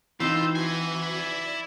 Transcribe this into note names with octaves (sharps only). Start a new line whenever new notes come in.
E3 C4 D#4 F4 E6 G6
E4 F#4 G#5
D5